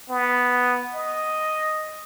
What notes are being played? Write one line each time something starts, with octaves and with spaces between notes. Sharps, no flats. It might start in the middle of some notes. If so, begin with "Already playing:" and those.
B3
D#5